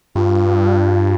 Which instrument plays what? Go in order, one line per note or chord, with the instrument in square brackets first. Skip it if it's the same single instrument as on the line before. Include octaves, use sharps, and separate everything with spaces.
[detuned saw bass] G2 [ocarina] F4